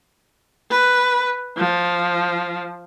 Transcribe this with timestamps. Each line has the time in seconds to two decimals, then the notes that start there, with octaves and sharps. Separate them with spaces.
0.70 B4
1.57 F3